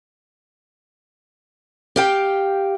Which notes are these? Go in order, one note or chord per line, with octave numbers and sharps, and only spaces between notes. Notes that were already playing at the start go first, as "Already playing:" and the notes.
G4 F5 G5